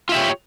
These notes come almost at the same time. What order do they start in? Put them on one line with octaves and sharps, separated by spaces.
F4 E5 G4 C#5